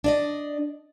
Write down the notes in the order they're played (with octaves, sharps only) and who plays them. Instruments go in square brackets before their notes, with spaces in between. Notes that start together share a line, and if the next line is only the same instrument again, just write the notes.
[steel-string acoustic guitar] D4 D5 D#5